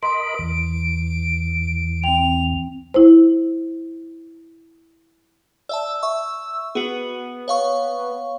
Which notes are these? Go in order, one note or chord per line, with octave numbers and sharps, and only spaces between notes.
A#4 D#5 B5 C6 D7
E2
C4 G5 F7
E4 C5
D5 E5 A5 E6
E5 C#6
B3 F#4 G#4
C#5 F5 C#6